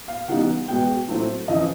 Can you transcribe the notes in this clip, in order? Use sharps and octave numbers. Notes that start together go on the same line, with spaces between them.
F5
C#3 E3 G3 B3 D#4 F#5
B2 G#3 B3 G5
A2 F#3 A3 C4 E4
F2 C#3 E3 D#5